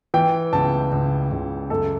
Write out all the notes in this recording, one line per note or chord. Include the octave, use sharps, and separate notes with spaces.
E3 G5
C#2 A5
C#2
C#2
F#2 A4